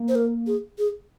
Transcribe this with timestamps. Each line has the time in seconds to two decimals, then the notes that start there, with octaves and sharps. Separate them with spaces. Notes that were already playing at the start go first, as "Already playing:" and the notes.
Already playing: A#3
0.08 C5
0.15 A#4
0.47 G#4
0.78 G#4